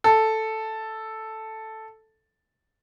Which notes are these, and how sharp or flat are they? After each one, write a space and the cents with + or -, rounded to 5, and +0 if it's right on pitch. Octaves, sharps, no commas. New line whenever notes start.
A4 +0